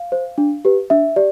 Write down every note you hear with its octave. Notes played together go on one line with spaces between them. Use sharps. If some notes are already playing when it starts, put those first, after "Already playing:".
Already playing: F5
C5
D4
G4 B4
D4 E5
G4 D5